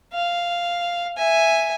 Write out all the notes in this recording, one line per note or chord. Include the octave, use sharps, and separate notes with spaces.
F5
E5 G#5